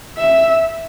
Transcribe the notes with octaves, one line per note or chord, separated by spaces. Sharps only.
E5